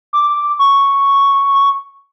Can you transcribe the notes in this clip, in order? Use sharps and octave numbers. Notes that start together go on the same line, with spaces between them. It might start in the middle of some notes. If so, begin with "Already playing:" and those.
D6
C#6